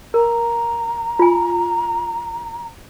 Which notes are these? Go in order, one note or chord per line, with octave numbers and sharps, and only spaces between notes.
A#4 A#5
F4 G#5